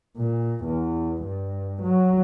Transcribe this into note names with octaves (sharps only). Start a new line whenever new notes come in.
A#2
E2
G2
F#3